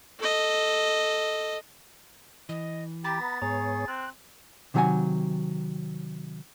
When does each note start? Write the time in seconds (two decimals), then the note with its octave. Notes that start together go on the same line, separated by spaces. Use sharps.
0.19 A4 D#5
2.49 E3 D#5
3.04 G4 A#5 B5 A6
3.21 B3
3.42 G#2 B3 G#4 C#5 A#5
3.88 C4 F#6
4.74 C3 D#3 F#3 G#4 F#5 G#5